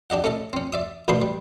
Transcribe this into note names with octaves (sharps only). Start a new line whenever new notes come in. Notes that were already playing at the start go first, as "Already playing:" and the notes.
D4 G4 D#5 F#5
A3 C#4 A4 D#5
C4 C#4
D5 E5 D#6
A1 B2 D4 B4 C6 D#6
G3